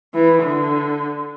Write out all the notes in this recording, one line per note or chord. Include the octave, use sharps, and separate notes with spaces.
E3
D3